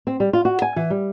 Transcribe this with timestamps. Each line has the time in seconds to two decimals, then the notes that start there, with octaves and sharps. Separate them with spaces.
0.07 C4
0.20 G3
0.33 F4
0.45 F#4
0.62 G#5
0.76 E3
0.90 G3